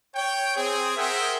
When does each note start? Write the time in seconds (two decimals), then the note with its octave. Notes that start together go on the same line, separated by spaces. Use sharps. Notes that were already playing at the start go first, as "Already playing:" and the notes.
0.15 C#5 G5
0.56 C4 G#4
0.97 G#4 A#4 C5 E5 F#5 G5